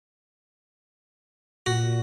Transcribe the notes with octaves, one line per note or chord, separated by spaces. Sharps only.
A#2 F#4